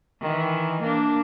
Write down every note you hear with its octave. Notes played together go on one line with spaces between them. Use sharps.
D#3 E3
A#3 D4